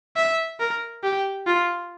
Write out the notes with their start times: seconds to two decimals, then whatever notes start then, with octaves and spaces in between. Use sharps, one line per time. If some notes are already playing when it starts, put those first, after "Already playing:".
0.16 E5
0.60 A#4
1.03 G4
1.47 F4